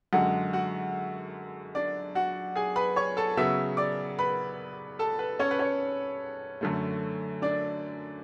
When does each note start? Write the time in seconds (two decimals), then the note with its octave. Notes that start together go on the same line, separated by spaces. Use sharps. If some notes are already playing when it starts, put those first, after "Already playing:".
0.13 F#2 D3 G#3 F#4 F#5
0.53 F#4 F#5
1.75 D4 D5
2.15 F#4 F#5
2.56 G#4 G#5
2.76 B4 B5
2.96 C#5 C#6
3.17 A4 A5
3.37 C#3 F#3 B3 E5 E6
3.77 D5 D6
4.19 B4 B5
4.99 A4 A5
5.19 B4
5.39 C#4 C#5
5.51 B4
5.59 C#4 C#5
6.61 F#2 D3 A3
7.42 D4 D5